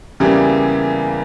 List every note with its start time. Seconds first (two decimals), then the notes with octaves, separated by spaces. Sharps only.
0.20 E2 C#3 E3 G3 A#3